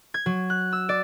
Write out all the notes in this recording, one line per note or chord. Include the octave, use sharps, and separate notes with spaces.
G#6
F#3
F#6
E6
D5